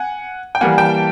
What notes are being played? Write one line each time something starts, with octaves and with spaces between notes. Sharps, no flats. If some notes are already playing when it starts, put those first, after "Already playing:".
Already playing: F#5 G#5
G5
E3 G3 A#3 F#5 G#5
G5 A5